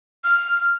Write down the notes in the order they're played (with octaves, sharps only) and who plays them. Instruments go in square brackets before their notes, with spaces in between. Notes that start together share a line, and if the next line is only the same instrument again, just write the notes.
[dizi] F6